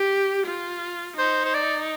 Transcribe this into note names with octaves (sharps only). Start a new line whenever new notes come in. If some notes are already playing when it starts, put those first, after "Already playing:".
Already playing: G4
F4
D#4 C5
C5
D5